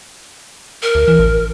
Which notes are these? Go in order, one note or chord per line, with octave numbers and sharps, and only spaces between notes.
A#4
D2
E3
A1